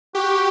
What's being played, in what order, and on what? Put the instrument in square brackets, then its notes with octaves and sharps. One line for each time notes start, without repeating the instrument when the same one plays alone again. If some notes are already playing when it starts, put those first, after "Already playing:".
[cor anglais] F#4 [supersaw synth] G4